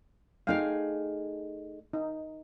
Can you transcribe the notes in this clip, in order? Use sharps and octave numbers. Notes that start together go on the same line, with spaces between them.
A3 D#4 G#4 F5 G5
D#4